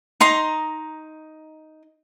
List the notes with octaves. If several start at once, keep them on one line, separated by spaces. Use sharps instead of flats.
D#4 A#5 C6